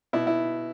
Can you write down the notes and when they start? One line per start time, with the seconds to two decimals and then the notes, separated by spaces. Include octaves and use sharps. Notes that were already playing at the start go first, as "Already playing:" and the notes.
0.13 B2 E4
0.27 E4